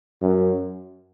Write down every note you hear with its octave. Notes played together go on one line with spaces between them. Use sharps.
F#2